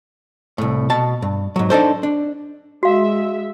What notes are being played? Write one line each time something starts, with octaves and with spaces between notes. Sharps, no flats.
C2 A2
B2 A5
G2
G#2 F#3
D4 D#4 A4 C5
D4
G#3 F#4 E5 F5